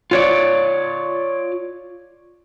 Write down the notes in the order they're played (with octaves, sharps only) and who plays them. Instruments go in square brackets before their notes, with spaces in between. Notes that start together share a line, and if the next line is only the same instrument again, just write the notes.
[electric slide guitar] F4 C#5 D5